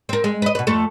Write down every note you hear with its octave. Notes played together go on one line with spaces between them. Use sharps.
C4 A#4
G#3
B4 D#5
B2 B4
F2 A3 A4